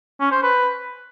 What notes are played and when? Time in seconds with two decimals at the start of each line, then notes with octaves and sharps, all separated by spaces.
0.20 C#4
0.32 C5
0.43 B4